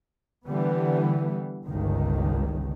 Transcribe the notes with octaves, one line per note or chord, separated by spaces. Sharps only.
D3 E3 G3 B3
G1 C#2 D#3